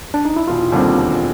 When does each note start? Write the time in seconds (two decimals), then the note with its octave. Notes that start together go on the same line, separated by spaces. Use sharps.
0.14 D4
0.25 D#4
0.37 E4
0.47 E1 F4
0.72 D#2 D3 G3 C4
0.97 E1